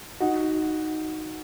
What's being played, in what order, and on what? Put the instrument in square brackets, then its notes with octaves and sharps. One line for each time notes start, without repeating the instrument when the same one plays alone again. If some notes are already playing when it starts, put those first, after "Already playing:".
[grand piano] D#4 F#4